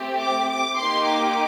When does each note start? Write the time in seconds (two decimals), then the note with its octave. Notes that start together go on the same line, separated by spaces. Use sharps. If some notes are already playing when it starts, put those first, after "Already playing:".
Already playing: A3 C4 G4
0.21 D6
0.50 D6
0.78 A#3 D#4 G4 C6
1.08 D6